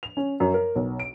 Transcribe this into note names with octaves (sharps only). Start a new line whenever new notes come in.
F7
C#4
F#2
A#4
B1
D7